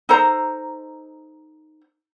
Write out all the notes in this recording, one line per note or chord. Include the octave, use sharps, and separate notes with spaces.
D#4 A4 C5 A#5